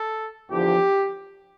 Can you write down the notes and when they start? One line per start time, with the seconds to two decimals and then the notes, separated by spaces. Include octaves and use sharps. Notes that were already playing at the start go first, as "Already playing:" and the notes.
Already playing: A4
0.49 E2 D3 F3 G4